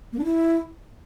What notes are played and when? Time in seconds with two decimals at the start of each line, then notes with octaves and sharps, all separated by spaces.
0.13 A#3
0.19 D4
0.24 E4